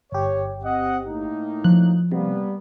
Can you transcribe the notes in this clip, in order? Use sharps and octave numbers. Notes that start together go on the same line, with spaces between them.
G1 G4 C#5
C4 D#5 F#5
A2 A#3 D#4
F3 F#6
C3 G3 A#3 B3